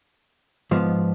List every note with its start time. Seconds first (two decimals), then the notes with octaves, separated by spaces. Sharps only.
0.71 G#2 F3 B3